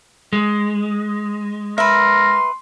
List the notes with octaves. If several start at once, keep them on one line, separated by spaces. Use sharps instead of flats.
G#3
A#4 B4 E5 C6